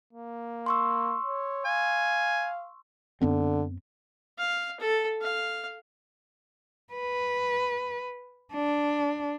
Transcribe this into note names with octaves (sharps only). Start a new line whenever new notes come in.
A#3
C6 C#6 E6
C#5
F5 G#5
F#2 D3 B3 C4
F5
A4
F5
B4
D4